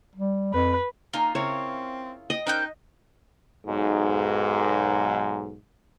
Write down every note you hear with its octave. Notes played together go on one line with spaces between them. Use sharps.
G3
F2 B4
A#3 D#4 F4 G#5
C#3 C4 E4 A#4 C#5
D#5 G5
C#4 D#4 A#4 C5 G5 F#6 G6
B1 G#2